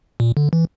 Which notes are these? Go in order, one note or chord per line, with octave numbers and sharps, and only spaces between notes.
A#2
D3
E3